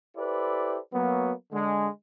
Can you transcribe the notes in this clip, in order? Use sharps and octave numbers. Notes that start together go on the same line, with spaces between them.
E4 G4 A4 B4 C5 D5
F#3 A#3 B3
D3 G#3